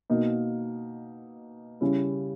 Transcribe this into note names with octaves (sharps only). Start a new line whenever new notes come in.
B2 A#3 D#4
C#3 G3 C#4 E4